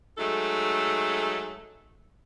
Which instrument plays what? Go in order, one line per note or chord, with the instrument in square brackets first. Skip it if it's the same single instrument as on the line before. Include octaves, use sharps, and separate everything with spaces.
[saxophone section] F#3 G#3 A3 D#4 A4